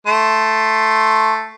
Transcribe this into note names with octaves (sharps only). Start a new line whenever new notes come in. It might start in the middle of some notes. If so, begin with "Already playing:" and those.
A3 C6